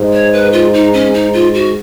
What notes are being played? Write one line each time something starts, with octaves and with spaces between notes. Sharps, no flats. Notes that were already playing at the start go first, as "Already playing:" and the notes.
Already playing: G#2
C#5
B4
F4
D#4
C#4
D#4
F4
F#4